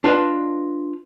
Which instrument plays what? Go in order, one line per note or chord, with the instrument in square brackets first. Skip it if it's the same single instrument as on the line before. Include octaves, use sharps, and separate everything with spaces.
[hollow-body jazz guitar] D4 F4 B4 D#5 A5